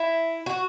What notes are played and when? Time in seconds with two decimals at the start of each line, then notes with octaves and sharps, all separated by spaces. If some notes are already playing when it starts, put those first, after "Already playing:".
Already playing: E4
0.46 F#4